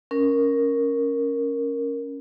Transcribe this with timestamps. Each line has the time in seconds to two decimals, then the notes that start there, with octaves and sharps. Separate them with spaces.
0.11 C#4 A#4